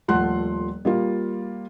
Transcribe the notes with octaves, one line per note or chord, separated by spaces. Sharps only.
D#1 F3 A3 F#5 C6 F#6
G3 A#3 F4